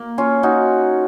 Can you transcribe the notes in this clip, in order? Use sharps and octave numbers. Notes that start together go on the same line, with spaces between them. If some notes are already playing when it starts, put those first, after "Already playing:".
Already playing: A#3
C#4 F4
D#4 F#4